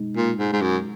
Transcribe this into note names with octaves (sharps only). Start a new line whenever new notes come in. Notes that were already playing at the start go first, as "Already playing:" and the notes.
Already playing: B2 G#3 D#4
A#2
G#2
G#2
F#2